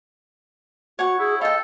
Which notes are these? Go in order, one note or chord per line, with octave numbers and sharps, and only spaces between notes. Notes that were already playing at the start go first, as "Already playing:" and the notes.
F#4 C#5 F#5 C#6
E4 G#4
F4 A4 D#5 G5